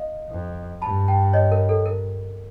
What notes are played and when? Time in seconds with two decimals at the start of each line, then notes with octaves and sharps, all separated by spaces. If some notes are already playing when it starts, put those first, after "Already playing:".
Already playing: D#5 F5
0.30 F2
0.82 G2 A5 B5
1.08 G5 A5
1.33 C#5 D#5
1.52 A#4
1.69 A4
1.86 A#4